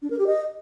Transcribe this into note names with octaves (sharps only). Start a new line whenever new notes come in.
D4
A#4
G4
D#5